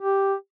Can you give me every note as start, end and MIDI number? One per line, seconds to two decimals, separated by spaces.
0.01 0.34 67